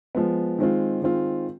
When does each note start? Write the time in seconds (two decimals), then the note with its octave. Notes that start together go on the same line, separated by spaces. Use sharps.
0.15 F3 G#3 B3
0.59 D#3 G#3 C4 F4
1.02 D#3 G#3 C4 F4